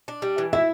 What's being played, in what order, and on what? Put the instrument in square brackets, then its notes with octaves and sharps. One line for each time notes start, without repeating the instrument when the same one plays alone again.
[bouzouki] D4
G3
E3
[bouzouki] E4 [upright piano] E5